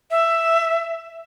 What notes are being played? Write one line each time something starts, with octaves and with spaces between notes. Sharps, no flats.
E5